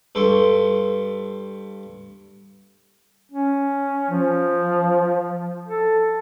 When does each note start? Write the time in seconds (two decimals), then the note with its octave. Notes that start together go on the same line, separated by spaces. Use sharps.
0.15 G2 A4 C6 C#6
3.31 C#4
4.10 F3
5.68 A4